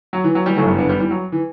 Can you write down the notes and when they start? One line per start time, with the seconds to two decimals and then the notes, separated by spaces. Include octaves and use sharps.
0.13 F#3
0.24 E3
0.35 F#3
0.46 E3 G3
0.56 G1 F#2 C#3 E3 F#3 A3
0.67 G3 B3
0.78 B3 D4
0.89 G3 B3
1.00 E3 G3
1.11 F#3
1.32 E3